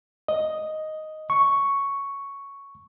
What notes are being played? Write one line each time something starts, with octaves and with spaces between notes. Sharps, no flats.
D#5
C#6